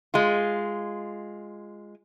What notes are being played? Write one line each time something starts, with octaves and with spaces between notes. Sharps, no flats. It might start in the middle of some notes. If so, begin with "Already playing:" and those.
G#3 F4